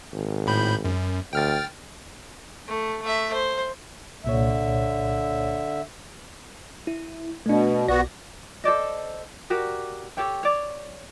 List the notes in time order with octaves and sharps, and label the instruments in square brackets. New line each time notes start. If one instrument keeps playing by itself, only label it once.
[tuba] G#1
[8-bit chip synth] A2 B5 G6
F#2
[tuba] D2 [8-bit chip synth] G5 F6 A6
[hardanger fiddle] A3
A3 E5
C5
[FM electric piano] C2 A#2 C#5 [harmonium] D3 E5
[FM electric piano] E4
[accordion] B2 [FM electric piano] A3 D4
[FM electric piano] B1 D5 A#6 [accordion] B3 F#4
[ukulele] A4 C5 D5 D#5
F#4 G4 A#4 D5
G4 A4 C#5 G5
C#5 D5